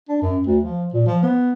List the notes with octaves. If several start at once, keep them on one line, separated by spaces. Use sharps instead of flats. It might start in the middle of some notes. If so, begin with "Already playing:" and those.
D4
F#2
D2
F3
A#2
F3
B3